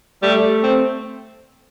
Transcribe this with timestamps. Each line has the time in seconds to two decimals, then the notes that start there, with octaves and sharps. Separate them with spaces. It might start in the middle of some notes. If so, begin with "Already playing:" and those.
0.23 G3 A3
0.63 C4